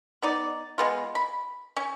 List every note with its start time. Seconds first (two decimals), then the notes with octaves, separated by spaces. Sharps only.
0.22 B3 D#4 D5
0.78 G#3 B3 F4
1.15 B5
1.76 C#4